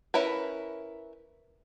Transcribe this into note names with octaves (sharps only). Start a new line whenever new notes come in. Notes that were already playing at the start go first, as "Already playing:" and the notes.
C#4 E4 A#4 B4